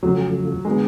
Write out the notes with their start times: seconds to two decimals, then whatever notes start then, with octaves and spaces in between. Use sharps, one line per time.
0.03 F2 C#3 F3 F#3 A3
0.65 D3 F#3 G#3 B3